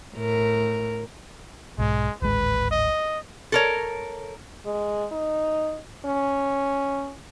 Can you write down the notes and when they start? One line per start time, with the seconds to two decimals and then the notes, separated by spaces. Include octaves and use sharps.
0.15 A2 A#4
1.78 B1 G#2 G#3
2.22 D1 G#1 G#3 B4
2.71 D#5
3.52 A4 A#4 C#5
4.65 G#3
5.12 D#4
6.05 C#4